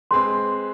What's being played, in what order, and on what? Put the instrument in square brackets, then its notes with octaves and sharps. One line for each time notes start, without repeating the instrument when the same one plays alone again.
[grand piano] G#3 C4 G#4 B4 [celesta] C6